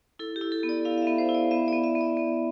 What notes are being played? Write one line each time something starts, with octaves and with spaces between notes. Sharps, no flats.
E4 A4
G4
E4
A4
B3
D5
E4 F5
F5
B3 E5
C5
E4
D5
B3 E5
B3 D5
E5
B3
D5
B3